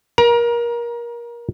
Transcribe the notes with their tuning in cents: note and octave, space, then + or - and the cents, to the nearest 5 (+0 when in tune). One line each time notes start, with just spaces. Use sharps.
A#4 +25 A#5 +35